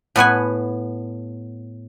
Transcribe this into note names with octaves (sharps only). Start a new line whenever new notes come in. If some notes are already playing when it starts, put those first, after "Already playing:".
A2 B3 F#5 G#5